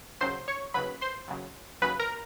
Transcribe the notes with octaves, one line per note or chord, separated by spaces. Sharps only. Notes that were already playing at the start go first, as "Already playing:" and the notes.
D#2 C#3 F#3 C5 C6
C#5 C#6
D#2 C#3 F#3 B4 B5
C5 C6
D#2 C#3 F#3
D#2 C#3 F#3 B4 B5
A#4 A#5